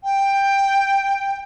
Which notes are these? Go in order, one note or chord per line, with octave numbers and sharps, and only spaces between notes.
G5